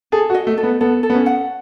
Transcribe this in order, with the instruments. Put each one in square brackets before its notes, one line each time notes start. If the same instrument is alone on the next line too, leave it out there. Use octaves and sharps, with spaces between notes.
[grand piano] G#4 [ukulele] A4
[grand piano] F#4
[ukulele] D#5
[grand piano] A3
[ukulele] A4
[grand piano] B3
[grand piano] B3 [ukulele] A4
[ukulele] A4
[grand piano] B3
C#4
[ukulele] F#5